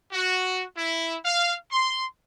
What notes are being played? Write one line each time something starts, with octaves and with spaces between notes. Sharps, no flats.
F#4
E4
F5
C6